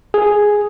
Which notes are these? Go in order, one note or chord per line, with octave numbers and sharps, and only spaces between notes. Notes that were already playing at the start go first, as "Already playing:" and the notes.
G#4